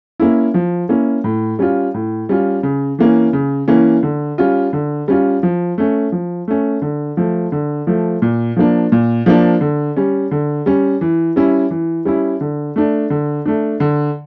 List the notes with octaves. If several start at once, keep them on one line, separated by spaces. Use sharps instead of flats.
A#3 C#4 E4
F3
A#3 C#4 E4
A2
G3 C#4 F4
A2
G3 C#4 F4
C#3
E3 A#3 C#4
C#3
E3 A#3 C#4
D3
G3 C#4 F4
D3
G3 C#4 F4
F3
A3 C#4
F3
A3 C#4
D3
F3 A3
D3
F3 A3
A#2
F3 A#3 D4
A#2
F3 A#3 D4
D3
G3 C#4
D3
G3 C#4
E3
G3 C#4 E4
E3
G3 C#4 E4
D3
A3 D4
D3
A3 D4
D3